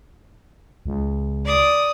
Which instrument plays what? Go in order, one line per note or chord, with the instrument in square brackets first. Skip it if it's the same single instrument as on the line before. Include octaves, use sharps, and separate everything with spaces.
[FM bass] C#2
[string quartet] D5 D#6